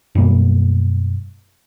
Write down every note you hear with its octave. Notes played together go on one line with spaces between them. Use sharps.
F#2 B2 G3 A#3